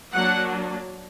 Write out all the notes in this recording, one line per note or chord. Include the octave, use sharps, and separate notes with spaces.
F#3 A#3 D4 F#5